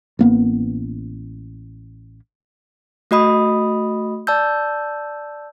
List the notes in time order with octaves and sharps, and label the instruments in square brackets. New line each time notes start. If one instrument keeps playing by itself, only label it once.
[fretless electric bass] A1 A#3 B3
[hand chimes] A3 F#4 D#5 B5 D#6
D5 A5 E6 G6